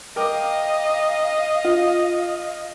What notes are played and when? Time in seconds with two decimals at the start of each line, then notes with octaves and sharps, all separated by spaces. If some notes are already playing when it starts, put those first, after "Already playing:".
0.16 A#4 D#5 F5 G5 D6
1.64 F4